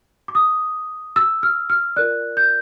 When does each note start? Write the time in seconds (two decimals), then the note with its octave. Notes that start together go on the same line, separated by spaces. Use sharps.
0.28 D6
0.35 D#6
1.16 E6
1.43 F6
1.70 F6
1.96 F4 A#4 D5 F#6
2.37 G6